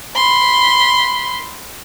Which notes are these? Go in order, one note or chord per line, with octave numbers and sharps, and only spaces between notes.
B5 C6